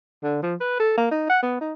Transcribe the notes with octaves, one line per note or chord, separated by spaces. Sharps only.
D3
F3
B4
A4
A#3
D#4
F#5
B3
D#4